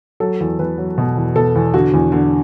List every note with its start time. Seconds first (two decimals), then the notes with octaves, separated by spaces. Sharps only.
0.20 F#3 A4
0.40 E2
0.59 E2 B4
0.78 F#3
0.98 B2
1.17 E2
1.36 B2 A4
1.55 E2
1.74 D3 F#4
1.93 E2
2.12 D3